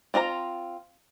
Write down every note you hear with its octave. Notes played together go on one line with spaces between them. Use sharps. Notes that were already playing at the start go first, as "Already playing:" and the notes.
C4 F4 D#5 A#5